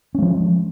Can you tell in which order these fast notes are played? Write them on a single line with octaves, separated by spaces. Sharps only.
C#4 G#3 F3